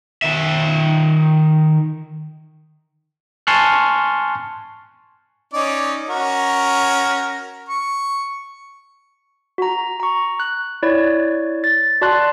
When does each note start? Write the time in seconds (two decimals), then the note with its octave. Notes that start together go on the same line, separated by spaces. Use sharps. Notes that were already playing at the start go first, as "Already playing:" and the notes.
0.22 D#3 E5
3.47 G#5 A5 C6 C#6 F6 F#6
5.54 C#4 D#4 D5
6.09 C#4 F#4 A#4
7.69 C#6
9.58 F#4 A#5
10.00 A#5 C#6
10.40 F#6
10.83 E4 C#5 D5
11.64 A6
12.01 F#4 D5 A5 C6 F#6